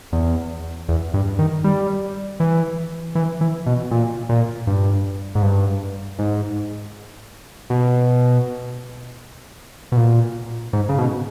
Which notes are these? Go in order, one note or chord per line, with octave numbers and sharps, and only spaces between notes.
E2
E2
G2
D#3
G3
E3
E3
E3
B2
A#2
A#2
G2
G#2
G2
G#2
B2
B2
A#2
G#2
C#3
B2